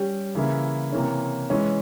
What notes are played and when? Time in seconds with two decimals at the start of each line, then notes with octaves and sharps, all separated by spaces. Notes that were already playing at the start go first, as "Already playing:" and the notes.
Already playing: G3 C#4 G4
0.35 C#3 E3 A#3 E4
0.92 C3 E3 A#3 C#4
1.50 E3 G#3 C#4